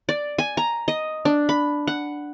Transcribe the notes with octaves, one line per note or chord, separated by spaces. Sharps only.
D5
G#5
A#5
D#5
D4
B5
F#5